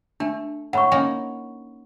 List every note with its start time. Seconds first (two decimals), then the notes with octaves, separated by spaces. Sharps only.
0.20 A3 D4
0.73 A2 F#5 B5 C#6
0.92 A#3 C#4 D#4 G#5